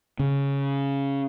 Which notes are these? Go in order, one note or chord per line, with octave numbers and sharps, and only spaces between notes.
C#3